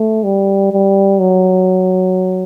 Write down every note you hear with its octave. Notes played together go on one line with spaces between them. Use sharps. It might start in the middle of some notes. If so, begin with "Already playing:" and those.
Already playing: A3
G3
G3
F#3